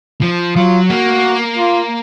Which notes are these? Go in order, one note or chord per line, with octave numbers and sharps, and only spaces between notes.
F3
F#3 F4
A#3 F#4
F4